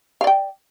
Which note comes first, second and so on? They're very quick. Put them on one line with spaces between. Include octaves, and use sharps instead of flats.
F5 D5 G5